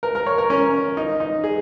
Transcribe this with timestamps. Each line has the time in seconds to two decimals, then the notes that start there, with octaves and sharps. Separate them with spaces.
0.03 A#4
0.15 A#4
0.26 C#5
0.38 A#4
0.50 C#4
0.97 D#4
1.20 D#4
1.44 G#4